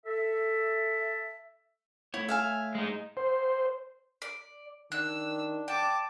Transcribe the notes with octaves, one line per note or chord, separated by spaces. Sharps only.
A4 E5
A3 E4 C#5
E5 F5 G#5
G#3 D#4
C5
D5
D#3 D4 E6 F#6
G5 A5 D6